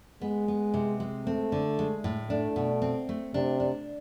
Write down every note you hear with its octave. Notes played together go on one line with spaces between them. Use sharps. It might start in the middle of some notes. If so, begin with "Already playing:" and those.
G#3 B3
B3
C3
G#3
A3 C4
D3
G#3
A2
A3 D4
B2
C4
A3
C3 D4
D4